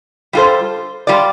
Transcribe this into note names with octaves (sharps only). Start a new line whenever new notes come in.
G3 F4 A4 C5
G3 F4 D5